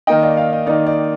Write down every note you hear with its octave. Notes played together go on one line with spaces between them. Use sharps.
D#3 A#3 D#4 D#5 G5
D5 F5
D5 F5
D#5
D#3 A#3 D#4 D5
D5